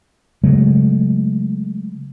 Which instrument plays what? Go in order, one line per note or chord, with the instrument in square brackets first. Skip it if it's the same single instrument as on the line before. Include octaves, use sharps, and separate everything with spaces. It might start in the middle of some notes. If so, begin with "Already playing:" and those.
[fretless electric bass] C#3 F#3 G#3 A3